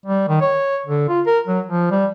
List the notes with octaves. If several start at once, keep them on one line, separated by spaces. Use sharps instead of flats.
G3
D#3
C#5
D3
F4
A#4
F#3
F3
G3